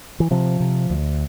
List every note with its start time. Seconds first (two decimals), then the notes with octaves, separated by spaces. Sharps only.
0.20 E3
0.31 C3 F3
0.60 C3
0.90 D2